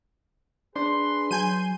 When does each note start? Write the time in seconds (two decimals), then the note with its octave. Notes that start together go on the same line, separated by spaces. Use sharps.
0.76 D4 G#4 B4 C6
1.31 F#3 G#5 G6 D#7